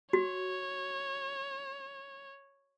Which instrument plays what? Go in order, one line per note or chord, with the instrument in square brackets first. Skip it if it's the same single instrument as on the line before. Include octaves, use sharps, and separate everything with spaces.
[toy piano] F#4 [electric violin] C#5